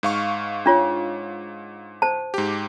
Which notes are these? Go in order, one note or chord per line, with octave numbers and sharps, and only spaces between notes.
G#2 F5 C#6
D4 F4 C#5
C5 A5
G#2 G4